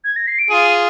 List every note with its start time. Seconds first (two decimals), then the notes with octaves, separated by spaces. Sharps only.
0.04 G#6
0.16 A#6
0.27 C7
0.39 D7
0.50 F4 G#4 D#7